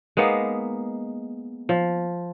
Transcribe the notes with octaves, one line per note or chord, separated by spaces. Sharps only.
G#3 A#3 B3 D#4
F3